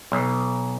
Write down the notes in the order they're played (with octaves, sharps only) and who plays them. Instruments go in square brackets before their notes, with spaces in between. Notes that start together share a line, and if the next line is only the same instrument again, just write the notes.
[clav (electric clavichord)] B1